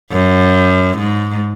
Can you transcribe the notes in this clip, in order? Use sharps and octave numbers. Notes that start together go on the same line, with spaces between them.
F#2
G#2